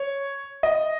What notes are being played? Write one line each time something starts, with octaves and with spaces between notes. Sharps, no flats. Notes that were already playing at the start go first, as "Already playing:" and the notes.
Already playing: C#5
D#5